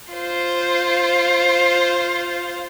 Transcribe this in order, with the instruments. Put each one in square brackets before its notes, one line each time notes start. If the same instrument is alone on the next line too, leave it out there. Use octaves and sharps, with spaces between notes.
[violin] F4 C5